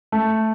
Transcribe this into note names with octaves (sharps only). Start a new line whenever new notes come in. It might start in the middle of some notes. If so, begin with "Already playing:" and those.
A3